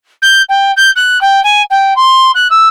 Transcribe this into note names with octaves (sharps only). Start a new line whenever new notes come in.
G6
G5
G6
F#6
G5
G#5
G5
C6
F#6
E6